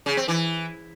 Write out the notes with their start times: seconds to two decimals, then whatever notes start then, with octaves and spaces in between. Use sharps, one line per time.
0.06 C#3
0.17 C4
0.28 E3